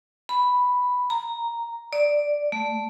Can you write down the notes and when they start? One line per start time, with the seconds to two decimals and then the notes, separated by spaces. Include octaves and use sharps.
0.29 B5
1.10 A#5
1.93 D5
2.52 A3